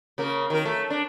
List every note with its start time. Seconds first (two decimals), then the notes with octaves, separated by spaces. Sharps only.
0.18 C#3 A#3
0.50 D#3 A#4
0.65 A3
0.90 D4